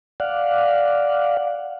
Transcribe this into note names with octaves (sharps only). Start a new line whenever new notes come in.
D5 F5 F#5